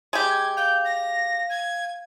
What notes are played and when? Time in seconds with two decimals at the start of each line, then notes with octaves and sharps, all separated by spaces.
0.13 G#3 G4 G#6
0.57 F5 G6
0.85 A#6
1.50 G#6